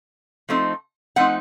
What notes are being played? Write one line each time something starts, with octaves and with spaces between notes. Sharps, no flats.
F3 A3 C4 D#4
F3 A3 C4 D#4 F#5